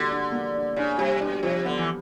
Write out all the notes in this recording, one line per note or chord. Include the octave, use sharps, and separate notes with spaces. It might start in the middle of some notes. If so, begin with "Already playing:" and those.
Already playing: D3 G3 A#3 F#4
D4
A#3
D4
C#3 D4
C3 G3
B2 D4
C3 F3
D3 B3
E3